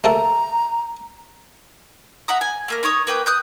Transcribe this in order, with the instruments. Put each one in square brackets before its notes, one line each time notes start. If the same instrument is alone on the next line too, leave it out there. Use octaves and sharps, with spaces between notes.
[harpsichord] A3 A#3 A4 [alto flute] A#5
[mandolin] E5 F#5 A#5 D#6
G#5
A3 A#3 A#4
D#4 C#5 C#6 D#6
A#3 B4 G5 D#6
D#6 F#6 G6